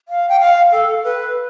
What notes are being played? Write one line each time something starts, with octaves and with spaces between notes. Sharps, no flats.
F5
G5
F5
A4
B4